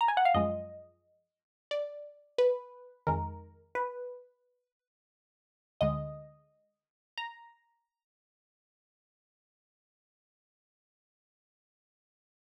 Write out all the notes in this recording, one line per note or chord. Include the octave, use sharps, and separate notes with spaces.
A#5
G#5
F#5
F5
F#2 F3 G#3 D#5
D5
B4
F2 D#3 G#3 A#4
B4
D2 D3 G#3 D#5
A#5